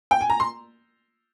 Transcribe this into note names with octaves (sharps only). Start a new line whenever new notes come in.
G5
G#5
A#5
C6